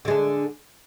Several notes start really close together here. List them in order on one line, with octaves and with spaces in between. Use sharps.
D3 G#3 D4